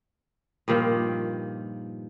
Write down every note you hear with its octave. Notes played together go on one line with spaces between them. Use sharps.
G2 A#2 D#3 F3